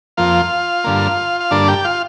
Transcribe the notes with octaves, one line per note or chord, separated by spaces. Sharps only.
F2 F3 A#3 F4 F5
G2 D3 A#3
F5
G2 D3 A#3 D4 D5
G4 G5
F4 F5